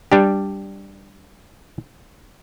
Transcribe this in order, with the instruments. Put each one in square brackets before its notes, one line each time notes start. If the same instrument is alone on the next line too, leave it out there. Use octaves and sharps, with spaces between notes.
[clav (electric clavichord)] G3 D4 G4